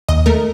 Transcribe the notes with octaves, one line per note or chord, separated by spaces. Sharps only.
D#2 D#5
A3 A#4